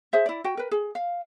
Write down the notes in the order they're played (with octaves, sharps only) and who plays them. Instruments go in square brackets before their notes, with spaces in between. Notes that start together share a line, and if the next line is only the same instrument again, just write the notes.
[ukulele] G#4 C5 E5
E4 D5
F#4 G5
A#4 B4
G#4
F5